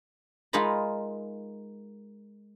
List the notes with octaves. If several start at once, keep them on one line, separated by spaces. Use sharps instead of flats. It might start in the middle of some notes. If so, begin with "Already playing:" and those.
G#3 D#4 F4 A#4 B5